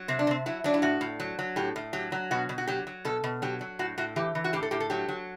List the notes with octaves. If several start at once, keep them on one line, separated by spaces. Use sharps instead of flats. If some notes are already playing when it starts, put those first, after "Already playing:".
Already playing: F#3
C3 C4
D4
C3 C4
F#3 E4
F#3 D4
E4
A2 F#4
A2
F#3
F#3
A2 G4
A2
F#3 G4
F#3
B2 F#4
B2
F#4
F#3 G4
F#3
B2 A4
B2
F#3 G4
F#3
A2 F#4
A2 F#4
E3 G4
E3
F#4
A2 G4
A4
A2 G4
A4
F#3 G4
F#3